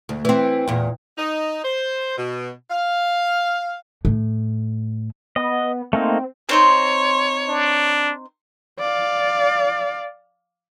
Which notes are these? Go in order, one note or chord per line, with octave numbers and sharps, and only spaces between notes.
D2
E3 C4
E2 A#2
D#4
C5
B2
F5
A2
B3 D#5
A3 A#3 C4 D#4
C4 D#4 C5 C#5
D4
D5 F5